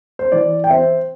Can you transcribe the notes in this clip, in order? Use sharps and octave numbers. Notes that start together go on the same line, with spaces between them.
C5
E3 D5
G5
C4 C5 E5